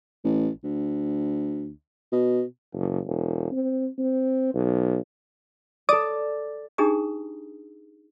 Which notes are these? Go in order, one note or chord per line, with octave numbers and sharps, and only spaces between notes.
A1
D2
B2
F#1
E1
C4
C4
B1
A4 D5 D6 D#6
D4 D#4 G4 G#4 A#5 D#6